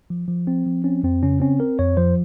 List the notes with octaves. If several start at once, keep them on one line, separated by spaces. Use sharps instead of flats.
F3
F3
C4
F3
C4 C#4
F2 C4
C#3 C#4
C4 C#4
C4 A#4
F2 C#5
F3 C5